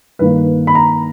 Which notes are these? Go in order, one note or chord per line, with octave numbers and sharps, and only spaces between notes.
G2 D#3 A#3 B4
B5
A#5